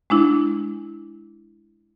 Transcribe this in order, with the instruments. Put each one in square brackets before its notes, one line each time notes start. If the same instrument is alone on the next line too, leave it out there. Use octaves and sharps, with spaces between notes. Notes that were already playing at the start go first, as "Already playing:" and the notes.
[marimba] G#3 D4 E4